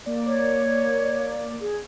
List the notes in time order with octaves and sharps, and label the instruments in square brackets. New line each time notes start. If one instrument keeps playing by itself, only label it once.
[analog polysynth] A#3 D5
[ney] C#5
G#4